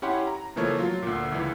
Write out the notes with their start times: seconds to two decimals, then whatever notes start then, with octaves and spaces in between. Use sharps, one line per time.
0.02 C#4 E4 G4 C#5 F#5 C6
0.27 A#5
0.56 C#3 E3 F3 A3 A#3 C#5
0.78 F#3 F4
1.03 D2 A#2
1.32 C#2 E3